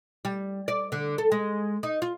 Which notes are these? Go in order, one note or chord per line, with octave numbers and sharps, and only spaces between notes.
G3
D5
D3
A4
G#3
D#4
F4